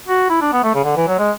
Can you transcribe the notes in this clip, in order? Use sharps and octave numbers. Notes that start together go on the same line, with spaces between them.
F#4
E4
D4
B3
A3
C#3
D3
E3
F#3
G#3